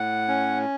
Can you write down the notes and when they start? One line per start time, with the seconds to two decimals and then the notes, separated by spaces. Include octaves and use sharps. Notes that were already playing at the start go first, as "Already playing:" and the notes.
Already playing: A2 F#5
0.28 C#4